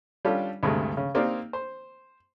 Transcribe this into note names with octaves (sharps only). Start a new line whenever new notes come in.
G3 C#4 D4 F4 G4 A4
D2 G2 C3 G#3 A3
C#3
A#3 C4 D#4 G4 A#4 D5
C5